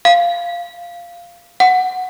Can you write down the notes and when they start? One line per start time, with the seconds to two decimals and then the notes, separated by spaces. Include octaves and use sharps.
0.05 F5
1.60 F#5